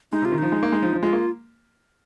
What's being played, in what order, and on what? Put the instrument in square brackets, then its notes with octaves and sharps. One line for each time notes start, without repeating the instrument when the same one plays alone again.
[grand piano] G#3 [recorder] D#4
[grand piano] C3 [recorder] F4
[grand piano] D#3
[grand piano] F3 [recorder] D#4
[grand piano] G#3
A#3
G#3
F3
F3
[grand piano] G#3 [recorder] F4
[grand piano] A#3